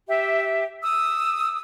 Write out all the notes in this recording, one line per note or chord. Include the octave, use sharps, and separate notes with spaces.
G4 E5
D#6 E6